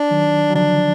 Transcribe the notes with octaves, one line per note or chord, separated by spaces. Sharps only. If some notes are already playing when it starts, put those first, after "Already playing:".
Already playing: D4
D#3 F#3
F#3
D3 F3 D4